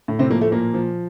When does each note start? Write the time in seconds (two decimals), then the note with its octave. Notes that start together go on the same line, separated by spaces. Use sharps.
0.08 A2
0.19 C3 C4
0.30 F3 A#3
0.41 A3
0.52 A#2 A#3
0.74 F3